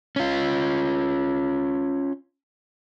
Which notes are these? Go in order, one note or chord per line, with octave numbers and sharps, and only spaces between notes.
C#4 F4